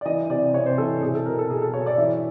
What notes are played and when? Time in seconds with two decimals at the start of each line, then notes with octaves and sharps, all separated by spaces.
0.01 D5
0.06 E3 D#5
0.30 C3 D5
0.54 C3 C#5
0.66 C5
0.78 E3 A4
1.02 B2 G#4
1.15 A4
1.26 B2 A#4
1.39 A4
1.50 B2 G#4
1.62 A4
1.74 B2 C#5
1.86 D5
1.98 E3 E5